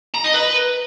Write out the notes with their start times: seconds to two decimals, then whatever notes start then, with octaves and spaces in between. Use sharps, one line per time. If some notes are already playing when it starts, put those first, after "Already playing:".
0.14 A#5
0.24 D#5
0.34 B4